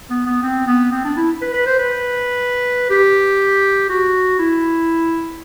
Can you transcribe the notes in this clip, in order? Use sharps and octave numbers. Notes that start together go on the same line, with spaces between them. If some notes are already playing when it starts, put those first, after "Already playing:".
B3
B3
C4
B3
C4
D4
E4
B4
B4
C5
B4
G4
F#4
E4